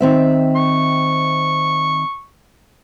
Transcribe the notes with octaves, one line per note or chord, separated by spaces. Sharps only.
D#3 C4 E5
C#6